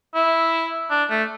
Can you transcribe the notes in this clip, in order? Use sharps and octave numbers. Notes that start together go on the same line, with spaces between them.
E4
D4
A3